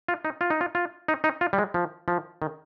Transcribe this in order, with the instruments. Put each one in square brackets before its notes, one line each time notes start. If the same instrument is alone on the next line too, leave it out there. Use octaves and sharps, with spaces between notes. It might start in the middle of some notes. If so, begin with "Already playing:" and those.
[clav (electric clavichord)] F4
D#4
F4
D#4
F4
F4
D#4
D#4
F4
G3
G#3
F3
F3
D#3